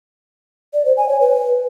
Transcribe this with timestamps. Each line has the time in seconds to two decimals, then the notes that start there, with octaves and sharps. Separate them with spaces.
0.73 D5
0.85 C5
0.97 G#5
1.09 C#5
1.21 B4